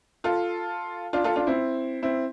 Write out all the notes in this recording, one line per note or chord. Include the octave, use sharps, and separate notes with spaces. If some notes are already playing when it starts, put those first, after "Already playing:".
F4 A4
D4 F4
F4 A4
D4 F4
C4 E4
C4 E4